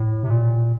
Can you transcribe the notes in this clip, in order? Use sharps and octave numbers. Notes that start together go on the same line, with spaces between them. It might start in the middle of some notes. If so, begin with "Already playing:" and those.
Already playing: A2
C3
A#2